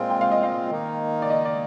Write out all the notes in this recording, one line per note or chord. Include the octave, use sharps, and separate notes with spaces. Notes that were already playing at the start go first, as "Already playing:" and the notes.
Already playing: A#2 G#3 C4 F4 G5
G5
F5
D#5
F5
D#3 A#3 D#4
D5
D#5
D5